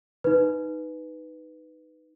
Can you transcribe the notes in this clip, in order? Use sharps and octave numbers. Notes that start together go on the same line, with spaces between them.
D#4 B4